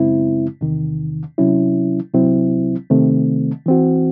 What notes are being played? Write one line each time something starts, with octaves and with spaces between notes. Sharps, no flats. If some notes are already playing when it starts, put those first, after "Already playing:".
Already playing: F#2 C#3 G#3 C4 E4
E2 C3 D#3
C3 F#3 C#4 E4
C2 C3 F#3 C4 E4
C3 D#3 A3 C4
E3 C4 F#4